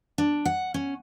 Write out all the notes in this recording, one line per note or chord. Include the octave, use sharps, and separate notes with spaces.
D4
F#5
C#4